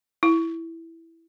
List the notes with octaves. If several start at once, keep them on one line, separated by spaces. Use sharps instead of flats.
E4